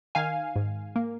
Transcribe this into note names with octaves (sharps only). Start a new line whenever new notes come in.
D#3 F5 G#5
G#2
A#3